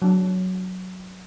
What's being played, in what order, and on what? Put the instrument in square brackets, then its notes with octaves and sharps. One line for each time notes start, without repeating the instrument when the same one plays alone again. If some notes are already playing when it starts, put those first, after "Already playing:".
[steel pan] F#3 D4